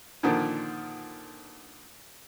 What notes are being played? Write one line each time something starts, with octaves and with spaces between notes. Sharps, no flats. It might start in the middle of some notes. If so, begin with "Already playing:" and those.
A#2 D3 D#3 F3